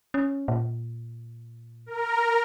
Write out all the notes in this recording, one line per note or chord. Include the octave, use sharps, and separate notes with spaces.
C#4
A#2
A#4